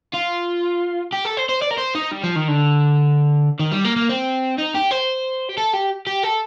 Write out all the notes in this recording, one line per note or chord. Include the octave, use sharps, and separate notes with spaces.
F4
G4
A4
C5
C5
D5
A#4
C5
D#4
G3
F3
D#3
D3
D#3
G3
A#3
A#3
C4
D#4
G4
C5
G4
A4
G4
G4
A4